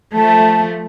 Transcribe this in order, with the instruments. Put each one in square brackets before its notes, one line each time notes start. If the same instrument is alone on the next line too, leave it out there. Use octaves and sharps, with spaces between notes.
[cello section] F3 A3 [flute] A5